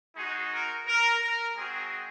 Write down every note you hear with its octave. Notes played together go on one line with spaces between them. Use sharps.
G#3 D#4 F#4 G#4
A#4
A#4
A#4
G#3 C4 F#4 G#4